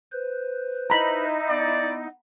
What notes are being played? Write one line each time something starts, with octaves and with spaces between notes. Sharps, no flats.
B4 C5
D#4 E4 A#5 B5
B3 D5